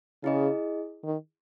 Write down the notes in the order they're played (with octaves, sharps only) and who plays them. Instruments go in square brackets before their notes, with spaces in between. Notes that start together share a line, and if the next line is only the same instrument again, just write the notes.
[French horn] C#3 [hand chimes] E4 G#4 D#5
[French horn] D#3